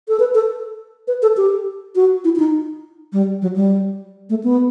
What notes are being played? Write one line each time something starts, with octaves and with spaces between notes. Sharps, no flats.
A4
B4
A4
B4
A4
G4
F#4
E4
E4
D#4
G3
F#3
G3
A3
B3